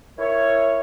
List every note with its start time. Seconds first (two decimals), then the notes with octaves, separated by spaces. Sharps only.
0.19 E4 A#4 C#5